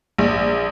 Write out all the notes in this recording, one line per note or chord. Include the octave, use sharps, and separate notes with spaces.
A#1